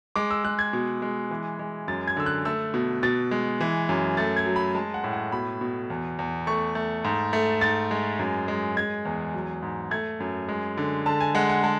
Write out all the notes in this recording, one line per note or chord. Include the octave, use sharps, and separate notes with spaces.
G#3 D6
E6
G#3 F#6
G#6
B2
G#3
E3
G#3
F#2 A6
G#6
D3 E6
F#6
A3 E6
B2
B2 A6
G#3
E3
F#2
A3 A6
G#6
F#3
B5
G#3 A5
F#5
A2
F#5
B2 B5
B2
E2
E2
A3 C#6
A3
G#2
A3
G#2 A6
G#3
F#2
G#3
G#3 G#6
E2
F#3
G#2
A3 G#6
F#2
G#3
D3
D3 A5
G#5
G#3 F#5
F#5
G#3 A5